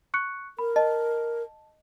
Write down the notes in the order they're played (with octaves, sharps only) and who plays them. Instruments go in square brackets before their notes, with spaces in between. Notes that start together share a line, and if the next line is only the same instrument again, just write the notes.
[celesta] C#6 F#6 C#7
[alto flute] A#4 [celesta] B5
[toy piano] D#5 [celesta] A5